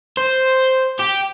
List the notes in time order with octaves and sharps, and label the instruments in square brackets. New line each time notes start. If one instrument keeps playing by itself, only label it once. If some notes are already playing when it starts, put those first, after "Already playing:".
[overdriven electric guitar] C5
G4